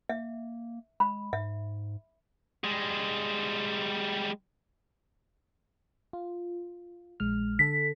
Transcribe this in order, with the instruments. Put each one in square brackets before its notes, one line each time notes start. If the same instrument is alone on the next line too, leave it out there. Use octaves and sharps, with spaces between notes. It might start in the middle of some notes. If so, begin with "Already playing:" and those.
[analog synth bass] A#3 [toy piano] E5
[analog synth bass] G#3 [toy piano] B5
[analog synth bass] G#2 [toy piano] E5
[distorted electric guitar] G3 G#3
[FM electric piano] F4
A#1 G#3 F6
[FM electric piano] D3 A4 [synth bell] B6